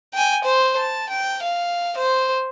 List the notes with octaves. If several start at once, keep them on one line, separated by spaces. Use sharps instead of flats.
G5 G#5
C5
A5
G5
F5
C5